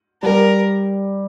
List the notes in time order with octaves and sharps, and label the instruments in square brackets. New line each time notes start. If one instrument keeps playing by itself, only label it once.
[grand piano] G3 [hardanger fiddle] A#4